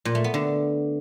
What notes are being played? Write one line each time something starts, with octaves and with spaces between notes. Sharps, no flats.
A#2
A3
B3
D3